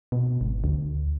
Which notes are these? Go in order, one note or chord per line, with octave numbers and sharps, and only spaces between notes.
B2
G#1
D2